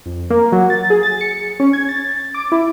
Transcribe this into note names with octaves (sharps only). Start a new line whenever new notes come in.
F2
A#3
F#3
A6
G#4
A6
C#7
C#4
G#6
A6
D6
E4